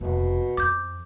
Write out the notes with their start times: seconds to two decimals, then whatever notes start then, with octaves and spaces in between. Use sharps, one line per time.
0.01 F1 D#2 B2
0.57 F2 D6 G6